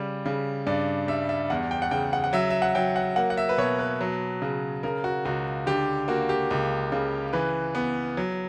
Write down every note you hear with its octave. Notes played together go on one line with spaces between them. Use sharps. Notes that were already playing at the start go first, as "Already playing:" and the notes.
Already playing: C#3 G3
C#3
G2 D5
G3 E5
E5
E2 F#5
G5
F#5
C#3 G5
F#5
F#5
F#3 E5
E5
F#5
F#3 G5
F#5
A#3 F#5
F#5
E5
B4
B2 C#5
B4
F#3
C#3
C#3 A#4
F#4
C#2 F#4
D3 G4
A#3 F#4
G4
C#2
C#3
E3 B4
B3
F#3